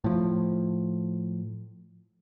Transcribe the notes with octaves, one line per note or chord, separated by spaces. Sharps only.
A2 F3